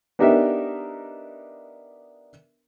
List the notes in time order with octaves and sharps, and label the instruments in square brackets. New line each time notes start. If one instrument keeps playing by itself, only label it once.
[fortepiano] B3 D4 D#4 G4 A#4 E5